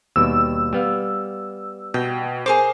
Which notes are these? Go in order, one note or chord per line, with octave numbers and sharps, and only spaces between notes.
D#2 B2 G3 E6
G3 B3 F5
B2 G5
G#4 A#4 C5 D6